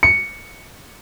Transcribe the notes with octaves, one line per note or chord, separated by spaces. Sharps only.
C#7